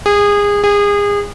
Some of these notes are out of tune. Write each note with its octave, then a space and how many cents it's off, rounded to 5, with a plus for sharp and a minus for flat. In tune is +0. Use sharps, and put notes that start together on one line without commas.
G#4 -25
G#4 -30